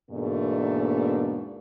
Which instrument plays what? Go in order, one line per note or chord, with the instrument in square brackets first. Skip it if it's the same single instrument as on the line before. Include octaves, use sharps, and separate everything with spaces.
[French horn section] E2 G#2 B2 A3 A#3 D4